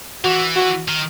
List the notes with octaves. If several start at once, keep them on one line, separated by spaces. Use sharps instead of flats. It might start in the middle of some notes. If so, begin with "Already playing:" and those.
E3 F#4
F#4
D#3